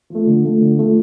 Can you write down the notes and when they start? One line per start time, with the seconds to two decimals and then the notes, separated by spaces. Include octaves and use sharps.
0.10 F3 A3
0.27 D3
0.44 F3 A3
0.61 D3
0.77 F3 A3